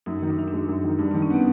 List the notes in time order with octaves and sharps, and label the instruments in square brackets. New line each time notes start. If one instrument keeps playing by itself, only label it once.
[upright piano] F#2 [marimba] D#4
[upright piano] D#3
[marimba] D4
[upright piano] F#2 [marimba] D#4
[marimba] D4
[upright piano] G#3
F#2
D#3
[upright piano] G2 [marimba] D4
[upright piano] D#3 [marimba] C4
[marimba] C#4
[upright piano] B3 [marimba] C4